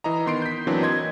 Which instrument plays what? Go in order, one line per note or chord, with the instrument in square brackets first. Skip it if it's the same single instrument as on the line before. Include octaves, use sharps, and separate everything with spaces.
[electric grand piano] E3 D#5 A#5
D#3 B3 C6 C7 D7
G6 B6
E3 F#3 A#3 C4 D4
D#5 C6 G#6